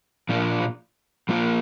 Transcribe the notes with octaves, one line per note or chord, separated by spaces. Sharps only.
A#2 F3 D4 F4
F3 A#3 F4